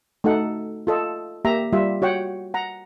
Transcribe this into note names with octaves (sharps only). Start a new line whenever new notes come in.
A3 D#4 F#4 A4 F#5
F4 A4 D#5
A#3 G4 E5 A#5
G3 F4 G4 E5
F#4 C#5 F#5 G5
F#5 A#5